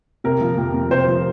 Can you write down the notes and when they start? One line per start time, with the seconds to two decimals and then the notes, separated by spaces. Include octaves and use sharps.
0.24 C3 A#4
0.41 F3
0.58 F2
0.74 F2
0.91 C3 C5
1.08 F3